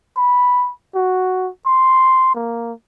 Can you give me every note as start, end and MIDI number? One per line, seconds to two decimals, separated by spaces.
0.17 0.71 83
0.94 1.49 66
1.66 2.33 84
2.35 2.72 58